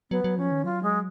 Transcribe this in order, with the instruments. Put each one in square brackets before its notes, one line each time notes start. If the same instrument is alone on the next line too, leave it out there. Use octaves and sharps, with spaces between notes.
[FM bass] F#3 [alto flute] B3
[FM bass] F#3
[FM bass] F3 [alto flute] C#4
[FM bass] D#3
[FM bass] F#3 [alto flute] F4
[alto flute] G#3